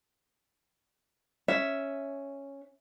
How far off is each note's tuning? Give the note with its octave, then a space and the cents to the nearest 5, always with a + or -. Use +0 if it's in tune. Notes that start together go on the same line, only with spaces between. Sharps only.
C#4 +0 E5 +0